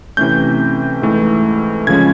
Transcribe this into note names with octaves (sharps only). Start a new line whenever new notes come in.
C3 E3 A3 C#4 G6
G#2 E3 A3
C#3 F3 G#3 C#4 G#6